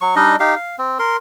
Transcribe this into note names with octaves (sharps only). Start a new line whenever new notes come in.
F#3 C#6
G3 D4 D#4 D#5
D#4 G4 F5
F5
C4
A#4 C6